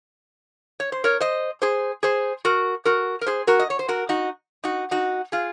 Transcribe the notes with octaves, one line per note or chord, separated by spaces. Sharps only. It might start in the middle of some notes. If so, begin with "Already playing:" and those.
C#5
C5
A#4 C#5
C5 D#5
G#4 C5
G#4 C5
F#4 A#4
F#4 A#4
A#4
G#4 C5
F#4 A#4
D#5
C#5
C5
F#4 A#4
D#4 F#4
D#4 F#4
D#4 F#4
F4 G#4